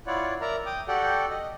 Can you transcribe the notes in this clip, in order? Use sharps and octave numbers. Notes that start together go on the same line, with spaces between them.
E4 F4 C#5 D5 F#5
A#4 D5 E5 A#5
G5 D6 D#6
F#4 G4 A4 D5 F#5 G5
D#5